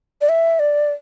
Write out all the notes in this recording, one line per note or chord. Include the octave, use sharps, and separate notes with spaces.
D5
E5
D5